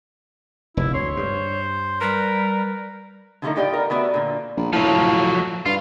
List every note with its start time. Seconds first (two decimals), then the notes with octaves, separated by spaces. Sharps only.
0.77 F1 D2 E4
0.94 D2 C#5 C6
1.17 G2 C5
2.01 G3 A#4 B4
3.42 D3 F3 G3 A3 A#3 D#4
3.56 A2 F4 G4 D5 D#5 G5
3.73 B3 A#4
3.90 A3 B3 F#4 D5 E5
4.14 A#2 D3
4.57 A#1
4.73 A2 F3 F#3
5.66 G2 F4